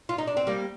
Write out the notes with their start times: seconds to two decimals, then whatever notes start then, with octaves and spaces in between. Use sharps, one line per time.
0.09 F4
0.18 D#4
0.27 D4
0.37 C4
0.47 G3 A#3